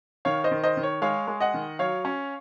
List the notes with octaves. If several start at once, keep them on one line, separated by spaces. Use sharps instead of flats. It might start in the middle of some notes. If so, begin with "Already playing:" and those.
D#3 C#5 F5
C5 D#5
D#3
C5 D#5
D#3
C#5
G#3 C#5 F5
G#3
D#5 F#5
D#3
F#3 C#5 F5
C#4